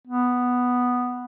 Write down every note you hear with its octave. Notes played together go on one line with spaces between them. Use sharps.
B3